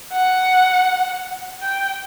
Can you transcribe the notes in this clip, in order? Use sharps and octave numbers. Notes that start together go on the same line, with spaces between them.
F#5
G5